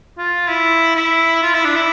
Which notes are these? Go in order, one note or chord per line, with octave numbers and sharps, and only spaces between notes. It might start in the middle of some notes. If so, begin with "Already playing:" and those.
F4
E4
E4
F4
E4
D4
E4